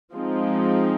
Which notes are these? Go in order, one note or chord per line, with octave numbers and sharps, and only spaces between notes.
F3 G#3 C4 D#4